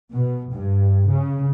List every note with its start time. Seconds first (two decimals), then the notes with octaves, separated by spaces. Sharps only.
0.13 B2
0.54 G2
1.10 C#3